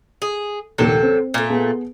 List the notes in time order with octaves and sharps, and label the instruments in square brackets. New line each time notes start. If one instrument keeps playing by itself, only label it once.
[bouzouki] G#4
[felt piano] A#1 D#2 G5 [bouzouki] C3 F#3 A4
[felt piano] C4
[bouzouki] A#2 A3
[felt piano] B3 G#4